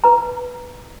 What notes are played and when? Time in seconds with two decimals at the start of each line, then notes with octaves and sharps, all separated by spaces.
0.04 B4 A#5